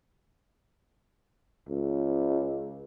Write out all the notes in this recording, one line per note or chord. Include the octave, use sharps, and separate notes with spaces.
C#2